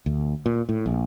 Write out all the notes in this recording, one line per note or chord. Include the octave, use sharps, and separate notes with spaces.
D2
A#2
A2
A#1